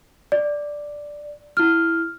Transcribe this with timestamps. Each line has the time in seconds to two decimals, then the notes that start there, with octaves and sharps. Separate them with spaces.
0.32 D5
1.57 E4 F6